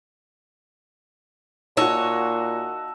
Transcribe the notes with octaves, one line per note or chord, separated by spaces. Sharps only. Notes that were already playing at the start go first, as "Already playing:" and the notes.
A#2 D#4 F#4 C#5 A5 E6 E7